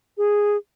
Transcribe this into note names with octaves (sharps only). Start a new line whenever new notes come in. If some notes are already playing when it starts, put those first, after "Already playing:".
G#4